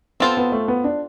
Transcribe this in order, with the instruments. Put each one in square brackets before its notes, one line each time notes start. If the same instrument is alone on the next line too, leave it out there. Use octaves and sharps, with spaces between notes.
[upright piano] B3 [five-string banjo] C4 F4 A4 C5
[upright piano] B3
A3
B3
D4